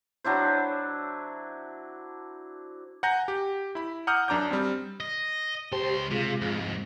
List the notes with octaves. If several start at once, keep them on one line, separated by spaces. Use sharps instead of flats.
F#3 D4 E4 C5
F#5 G#5 A#5 G6 A#6
G4
E4 B5
F#5 A#5 D6 D#6 F6 G6
F#2 D4 A#5 D6 G6
G3 C4
D#5
C#2 G4 C5 A5 C6
C3 G#3 F4
F2 G#2